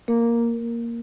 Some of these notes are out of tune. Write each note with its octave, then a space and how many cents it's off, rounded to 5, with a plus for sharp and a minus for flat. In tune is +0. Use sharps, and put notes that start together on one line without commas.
A#3 +0 A#4 +0